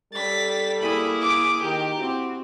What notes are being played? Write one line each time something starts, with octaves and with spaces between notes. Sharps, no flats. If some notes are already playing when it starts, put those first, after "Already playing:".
G3 A4 A6 B6
A#3 E4 G#4 B5
D6
D#3 G4
C4 E4 F#4